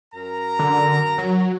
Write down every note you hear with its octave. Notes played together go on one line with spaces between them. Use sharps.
F#2 A#4 A#5
D3
F#3